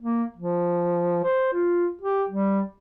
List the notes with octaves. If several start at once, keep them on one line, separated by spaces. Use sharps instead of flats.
A#3
F3
C5
F4
G4
G3